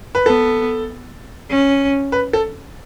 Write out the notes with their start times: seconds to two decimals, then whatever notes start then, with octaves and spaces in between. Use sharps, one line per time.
0.15 B4
0.26 B3 A4
1.50 C#4
2.12 B4
2.33 A4